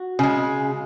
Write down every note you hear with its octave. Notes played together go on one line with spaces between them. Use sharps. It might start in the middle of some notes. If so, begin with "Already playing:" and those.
Already playing: F#4
C#3 G#3